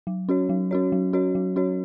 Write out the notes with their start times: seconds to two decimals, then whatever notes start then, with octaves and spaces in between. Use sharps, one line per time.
0.07 F#3
0.29 C#4 F#4 C#5
0.49 F#3
0.71 C#4 F#4 C#5
0.92 F#3
1.13 C#4 F#4 C#5
1.35 F#3
1.56 C#4 F#4 C#5